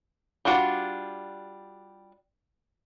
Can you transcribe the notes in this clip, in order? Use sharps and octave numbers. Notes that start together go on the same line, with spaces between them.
G3 D4 F4 F#4 D5